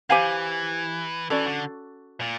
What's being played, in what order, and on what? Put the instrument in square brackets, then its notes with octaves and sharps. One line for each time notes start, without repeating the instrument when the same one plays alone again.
[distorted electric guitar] E3 [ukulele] G4 C5 F5 G#5
[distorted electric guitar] E3 [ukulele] C#4 F#4 A4 D5
[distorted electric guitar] D3
A#2